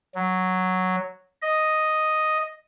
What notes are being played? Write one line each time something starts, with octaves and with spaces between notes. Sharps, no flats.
F#3
D#5